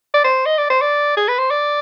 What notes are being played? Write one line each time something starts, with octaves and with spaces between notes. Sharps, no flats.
D5
C5
D#5
D5
C5
D5
G#4
B4
C5
D5